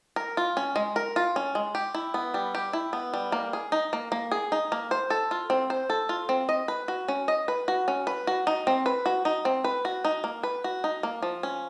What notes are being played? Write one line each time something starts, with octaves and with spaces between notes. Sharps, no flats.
A#4
F4
C#4
G#3
A#4
F4
C#4
G#3
G4
E4
B3
G3
G4
E4
B3
G3
A#3
G#4
D#4
A#3
A#3
G#4
D#4
A#3
C5
A4
F4
C4
C5
A4
F4
C4
D#5
B4
F#4
C#4
D#5
B4
F#4
C#4
B4
F#4
D#4
C4
B4
F#4
D#4
C4
B4
F#4
D#4
A#3
B4
F#4
D#4
A#3
F3
C#4